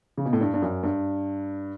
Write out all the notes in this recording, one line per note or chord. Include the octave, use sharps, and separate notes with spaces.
C#3
B2
A2
G2
G2
F#2
G2